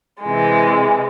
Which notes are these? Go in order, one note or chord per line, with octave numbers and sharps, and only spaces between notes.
C3 E3 G#3